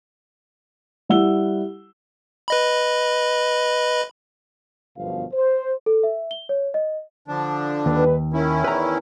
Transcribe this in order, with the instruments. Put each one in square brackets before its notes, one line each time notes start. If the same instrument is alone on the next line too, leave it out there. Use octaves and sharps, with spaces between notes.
[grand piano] G3 E4 F#5 E6 G7
[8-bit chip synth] B4 D#5 B5
[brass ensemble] G1 F#2 B2 F3 F5
C5
[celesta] A4
E5
G7
C#5
D#5
[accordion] D3 F3 D4
[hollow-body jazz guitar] D#2 [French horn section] D#3 G3 B4
[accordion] D#3 C#4 E4 [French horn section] A#4
[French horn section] E2 [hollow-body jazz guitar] B4 A#5